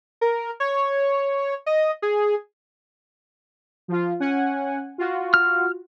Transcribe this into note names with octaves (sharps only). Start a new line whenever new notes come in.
A#4
C#5
D#5
G#4
F3 F4
C#4 F#5 G#5
F4 F#4
F6